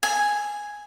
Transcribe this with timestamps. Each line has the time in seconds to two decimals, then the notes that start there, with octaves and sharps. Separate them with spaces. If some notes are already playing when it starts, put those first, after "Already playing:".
0.03 G#5